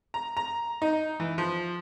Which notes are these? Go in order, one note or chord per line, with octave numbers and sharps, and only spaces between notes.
A#5
A#5
D#4
E3
F3